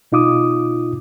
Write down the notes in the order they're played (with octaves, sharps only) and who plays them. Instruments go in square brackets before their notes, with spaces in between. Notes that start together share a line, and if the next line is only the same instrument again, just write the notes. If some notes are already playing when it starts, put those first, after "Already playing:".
[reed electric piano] B2 D#4 F4 D6 D#6